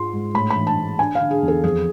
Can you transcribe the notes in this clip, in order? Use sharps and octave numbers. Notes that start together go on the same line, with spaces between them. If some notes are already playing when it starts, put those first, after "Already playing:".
Already playing: G#2 G#3 F4 C6
G#2
A2 B5
B5
E3
A5
A2
D4 G#5
D3 F5
G#4
E2
A4
F2 G#4